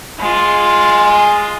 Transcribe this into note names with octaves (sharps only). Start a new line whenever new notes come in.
G#3 F4